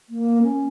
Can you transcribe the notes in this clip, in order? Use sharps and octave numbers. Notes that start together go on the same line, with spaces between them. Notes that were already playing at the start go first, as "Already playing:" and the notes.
A#3
C#4